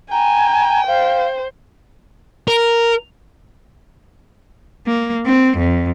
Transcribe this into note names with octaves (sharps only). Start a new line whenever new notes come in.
G5 G#5 A#5
C5 F5
A#4
A#3
C4
F2